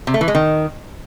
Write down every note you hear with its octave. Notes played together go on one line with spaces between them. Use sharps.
C3
A3
E3
G#3
D#3